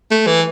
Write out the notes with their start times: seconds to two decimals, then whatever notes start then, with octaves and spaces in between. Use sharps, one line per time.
0.11 A3
0.27 E3